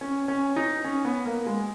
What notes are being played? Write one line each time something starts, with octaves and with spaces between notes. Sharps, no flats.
C#4
C#4
D#4
C#4
B3
A#3
G#3